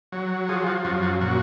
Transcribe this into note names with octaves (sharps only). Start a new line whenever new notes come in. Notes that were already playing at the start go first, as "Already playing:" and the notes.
F#3
F3 G#4
F#4
F#2 F#4
F#4
A#2 F#4